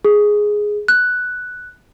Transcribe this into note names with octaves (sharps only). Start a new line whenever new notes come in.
G#4
F#6